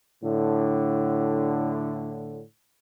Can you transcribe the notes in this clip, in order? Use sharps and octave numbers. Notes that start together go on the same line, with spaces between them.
A2 D3